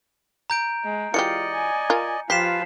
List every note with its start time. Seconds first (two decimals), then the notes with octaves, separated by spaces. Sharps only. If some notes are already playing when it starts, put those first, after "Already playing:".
0.50 A#5 G6 D7
0.85 G#3
1.14 E3 G#3 F4 G4 D5 D#5 C#7
1.53 G#5
1.90 F4 A#4
2.30 F3 F4 G4 B4 B6 C7 E7